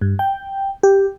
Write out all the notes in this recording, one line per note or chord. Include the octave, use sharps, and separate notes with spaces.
G2
G5
G4